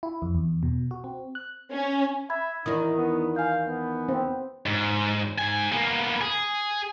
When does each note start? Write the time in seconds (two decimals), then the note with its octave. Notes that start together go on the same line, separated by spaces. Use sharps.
0.03 E4
0.22 F2
0.35 E2
0.63 B2
0.91 F#4
1.04 C4
1.35 F#6
1.72 C#4
2.30 E5 B5 G#6
2.66 E2 D#3 D#4 E4 D#6
2.97 B3
3.36 F5 G#5 G6
3.68 B3
4.09 C4
4.66 G#2
5.39 G#2 G#5
5.72 A#3 B3
6.21 G#4